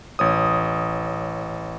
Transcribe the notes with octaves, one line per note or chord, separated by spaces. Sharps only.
A1 C#5 D#6